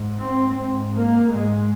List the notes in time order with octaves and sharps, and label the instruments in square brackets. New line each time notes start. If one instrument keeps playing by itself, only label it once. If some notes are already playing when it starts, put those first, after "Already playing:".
Already playing: [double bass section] G#2
C4
G#2
A#3
G#2 G#3